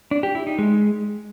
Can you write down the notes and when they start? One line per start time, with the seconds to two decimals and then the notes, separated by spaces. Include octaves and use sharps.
0.11 D4
0.23 G4
0.35 E4
0.47 D#4
0.59 G#3